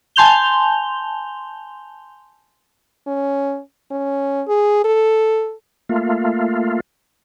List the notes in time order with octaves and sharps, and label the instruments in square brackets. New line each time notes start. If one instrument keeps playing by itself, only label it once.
[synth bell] G#5 A5 C6 G6 F7 G7
[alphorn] C#4
C#4
G#4
A4
[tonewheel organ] A3 A#3 F4